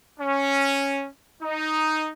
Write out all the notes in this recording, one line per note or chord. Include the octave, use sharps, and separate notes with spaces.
C#4
D#4